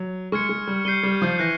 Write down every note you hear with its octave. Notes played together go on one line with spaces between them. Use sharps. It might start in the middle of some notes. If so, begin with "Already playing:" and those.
Already playing: F#3
G#3 C#6 F6 G#6 C#7
G#3
G3
G3 G6 C7 D#7 G7
G3
F3
E3 F#6 A#6 D#7